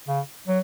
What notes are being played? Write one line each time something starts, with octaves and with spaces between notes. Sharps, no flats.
C#3
F#3